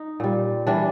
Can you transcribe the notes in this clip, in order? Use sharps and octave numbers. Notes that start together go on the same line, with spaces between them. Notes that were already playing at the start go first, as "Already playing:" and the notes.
Already playing: D#4
A#2 G3
E3 G3 D4